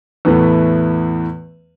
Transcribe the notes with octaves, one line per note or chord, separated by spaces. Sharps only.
E2 A2 E3 A3 B3